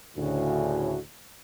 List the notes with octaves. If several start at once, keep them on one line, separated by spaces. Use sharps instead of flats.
D2 A2 C#3 F#4